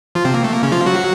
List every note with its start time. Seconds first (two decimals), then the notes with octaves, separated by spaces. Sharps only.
0.15 F3 F4
0.25 C3 C4
0.34 A#3
0.44 A3
0.53 A#3
0.63 C#3 C#4
0.72 F3 F4
0.86 F#3 F#4